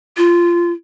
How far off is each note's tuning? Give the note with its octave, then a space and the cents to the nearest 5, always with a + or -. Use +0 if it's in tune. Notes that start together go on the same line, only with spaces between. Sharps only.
F4 -15